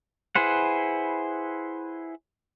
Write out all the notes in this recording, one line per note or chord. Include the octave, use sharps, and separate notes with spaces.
E4 G#4 B4 C5 F#5